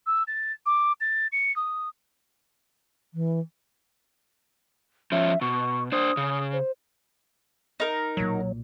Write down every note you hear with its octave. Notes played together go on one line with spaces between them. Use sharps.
E6
A6
D6
A6
C#7
D#6
E3
F3 C#4 E5
B2 C#6
D4 C5 D#6
C#3
C5
D#4 A#4
B1 A#2 F#3